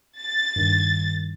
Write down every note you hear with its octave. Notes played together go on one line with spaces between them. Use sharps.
A6
G2 D#3